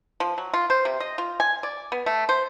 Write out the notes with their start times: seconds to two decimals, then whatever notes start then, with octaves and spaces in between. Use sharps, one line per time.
0.20 F3
0.38 F#3
0.53 F4
0.70 C5
0.85 C3
1.00 D#5
1.18 F4
1.40 G#5
1.63 D5
1.92 B3
2.06 A3
2.29 C5